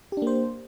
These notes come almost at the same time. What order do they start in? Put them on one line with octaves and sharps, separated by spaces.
G4 D4 A#3 C5